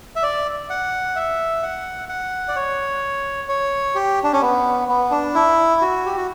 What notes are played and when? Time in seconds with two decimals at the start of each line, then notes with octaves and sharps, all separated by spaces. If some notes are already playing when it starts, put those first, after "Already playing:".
0.16 E5
0.23 D5
0.70 F#5
1.16 E5
1.62 F#5
2.09 F#5
2.48 D5
2.56 C#5
3.49 C#5
3.95 G4
4.24 D4
4.33 C#4
4.42 B3
4.88 B3
5.11 D4
5.35 E4
5.81 F#4
6.06 G4
6.17 F#4